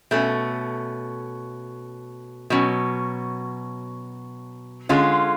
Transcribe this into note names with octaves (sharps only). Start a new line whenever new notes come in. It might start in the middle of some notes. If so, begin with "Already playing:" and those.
B2 A3 C#4
B2 F#3 C#4
D3 G#3 C#4 F4